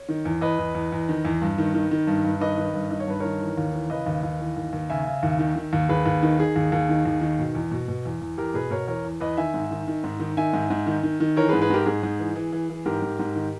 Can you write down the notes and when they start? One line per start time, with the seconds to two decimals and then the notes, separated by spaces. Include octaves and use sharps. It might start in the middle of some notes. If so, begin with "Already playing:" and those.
Already playing: C#5
0.09 D#3
0.25 E2
0.41 E2 B4 D#5
0.59 E2
0.75 E2
0.92 E2
1.09 D#3
1.25 E2
1.42 G2
1.58 D#3
1.74 D#3
1.91 D#3
2.07 G2
2.24 G2
2.41 D#3 B4 D#5
2.57 D#3
2.74 G2
2.90 D#3 D#5
3.00 C#5
3.07 G2 B4
3.20 D#3 A#4 C#5
3.41 E3
3.57 D#2
3.73 E3
3.90 C#3 B4 D#5
4.06 D#2
4.23 D#2
4.40 E3
4.56 D#2
4.73 D#2
4.89 C#3 E5 G#5
5.06 C#3
5.23 D#2
5.39 D#3
5.56 D#3
5.73 D#2
5.89 D#2 G#4 B4
6.06 D#2
6.23 D#3
6.39 D#3 G#4
6.56 D#2
6.72 D#2
6.89 D#3
7.05 D#2
7.21 D#3
7.39 B2
7.55 E2
7.71 B2
7.88 B2
8.05 E2
8.21 E2
8.38 E2 G4 A#4
8.54 B2 G#4 B4
8.71 B2 A#4 C#5
8.88 E2 A#4 C#5
9.05 E2
9.20 E2 B4 D#5
9.37 D#3 E5 G#5
9.54 G#2
9.71 D#3
9.87 D#3
10.04 G#2
10.20 D#3
10.37 D#3 E5 G#5
10.53 G#2
10.70 G#2
10.86 D#3
11.03 D#3
11.20 D#3
11.37 E3 A#4 C#5
11.49 G#4 B4
11.53 G#2
11.61 G#4 B4
11.70 G#2 G4 A#4
11.86 G#2 G#4
12.03 G#2
12.19 E3
12.36 E3
12.53 E3
12.70 E3
12.86 G#2 G4 A#4
13.02 G#2
13.19 G#2
13.35 D#3